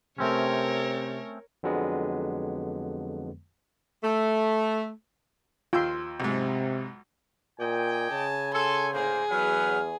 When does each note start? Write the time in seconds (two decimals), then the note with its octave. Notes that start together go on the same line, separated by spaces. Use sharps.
0.18 C3 A3 C4 C#4 A#4 C#5
1.63 F2 D3 F#3 G#3 B3
4.03 A3
5.73 D#2 F4 G5 C6 E6
6.20 B1 G#2 C3
7.60 A#2 D5 D#5 G5 G#5
8.11 C#3 A5
8.53 A4 G#5 C6
8.93 A2 D3 A#3 G#4 C5
9.31 E2 F#3 B4 F6